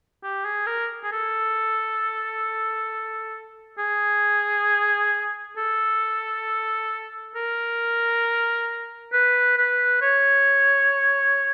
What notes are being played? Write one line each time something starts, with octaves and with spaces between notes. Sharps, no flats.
G4
G#4
A#4
G#4
A4
G#4
A4
A#4
B4
B4
C#5